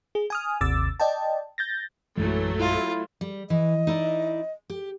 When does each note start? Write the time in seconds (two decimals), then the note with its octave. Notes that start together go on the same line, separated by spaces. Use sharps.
0.15 G#4
0.30 G#5 D#6 F6
0.61 G#1 D#2 C3 D6 E6 A6
1.00 D5 D#5 G5 A5
1.58 G6 A6 A#6
2.18 A#1 F#2 E3 F#3 G#3 A3
2.60 E4 F4
3.21 G3
3.50 E3 D#5
3.87 D#4 E4 D5
4.70 G4